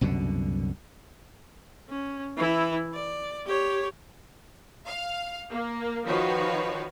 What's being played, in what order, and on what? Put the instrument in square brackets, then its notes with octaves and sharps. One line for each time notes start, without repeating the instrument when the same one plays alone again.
[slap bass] C2 F#2 B2 D3
[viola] C#4
E3 E4
D5
G4 C#5
[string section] F5
A#3
D#3 F3 F#4 B4 C#5